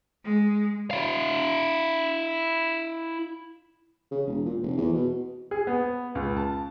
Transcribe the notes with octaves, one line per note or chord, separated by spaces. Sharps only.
G#3
E4 F5
C#3
E1
A#2
F1
E2
B2
G#4
B3
C#2
A5